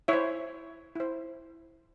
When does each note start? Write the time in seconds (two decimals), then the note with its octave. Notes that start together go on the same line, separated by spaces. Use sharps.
0.08 E4 C5 C#5 E5
0.95 E4 C5